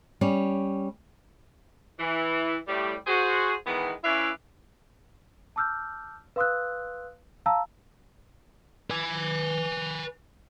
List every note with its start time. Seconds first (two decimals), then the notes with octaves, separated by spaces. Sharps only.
0.21 G3 C#4
1.99 E3
2.67 A2 G3
3.06 F#4 G#4 C5
3.66 D#3 E3 G#3 B3
4.04 C#4 E4 B4 D5 E5 F5
5.56 A5 D6 E6 F6 G6
6.36 B4 F5 C6 D#6 E6 F#6
7.46 F5 A5 A#5 E6
8.90 B4 G#5